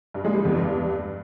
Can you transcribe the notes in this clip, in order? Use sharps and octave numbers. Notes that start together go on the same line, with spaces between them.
G2
G#3
G3
E2
G2